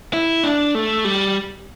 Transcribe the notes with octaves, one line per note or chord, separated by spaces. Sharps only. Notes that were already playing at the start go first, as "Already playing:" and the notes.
E4
D4
A3
G3